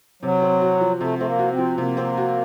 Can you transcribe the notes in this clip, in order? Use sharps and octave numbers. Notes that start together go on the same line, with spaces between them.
C3 F#3
C4
F#4
F3
C3 A3
A3 C4
A#3
F#4
C4
F3
C3 A#3
C4
F#4